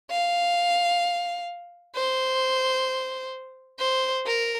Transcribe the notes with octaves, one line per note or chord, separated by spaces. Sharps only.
F5
C5
C5
A#4